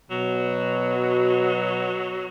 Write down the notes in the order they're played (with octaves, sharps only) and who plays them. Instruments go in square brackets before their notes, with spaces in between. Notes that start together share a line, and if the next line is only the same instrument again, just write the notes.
[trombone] B2 [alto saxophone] F#3